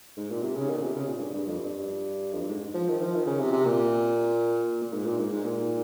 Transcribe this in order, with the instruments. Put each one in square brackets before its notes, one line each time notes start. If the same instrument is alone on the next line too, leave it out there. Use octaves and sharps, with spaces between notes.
[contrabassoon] G#2
A#2
C3
C#3
D#3
A#2
C3
C#3
A#2
G2
G2
F2
G2
F2
G2
G#2
F3
D#3
F3
D#3
C#3
C3
C3
A#2
A#2
G#2
A#2
G#2
G#2
A#2